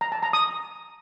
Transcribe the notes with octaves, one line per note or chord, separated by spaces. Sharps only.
A#5
A5
A#5
D#6